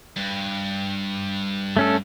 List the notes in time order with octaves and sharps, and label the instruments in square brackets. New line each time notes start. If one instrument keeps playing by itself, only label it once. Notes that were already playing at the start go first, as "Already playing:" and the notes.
[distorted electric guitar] G2
[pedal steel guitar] A3 C#4 A4